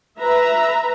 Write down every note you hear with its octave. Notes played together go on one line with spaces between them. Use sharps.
B4 E5 A#5